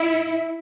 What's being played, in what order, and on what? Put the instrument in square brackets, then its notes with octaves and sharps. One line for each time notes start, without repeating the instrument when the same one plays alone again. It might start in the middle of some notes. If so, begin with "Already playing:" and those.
Already playing: [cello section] E4